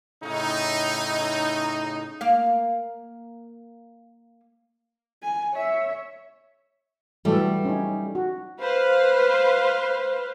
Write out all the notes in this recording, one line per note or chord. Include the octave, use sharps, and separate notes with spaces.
A2 C#3 D#4
A#3 F5
G#5
C#5 E5
E3 F#3 G3 A3 D4 A4
C#4 D#4
F#4
B4 C5 F5